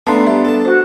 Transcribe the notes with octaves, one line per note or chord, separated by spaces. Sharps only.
A3 B3 D4 E5 F5 A5 A#5 C6
G3 E5
A4 A5
F#4 C5 F#5